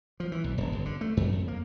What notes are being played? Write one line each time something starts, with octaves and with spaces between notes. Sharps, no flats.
F3
E3
B1
D#1
G1
D3
A3
F#2
F2
A#3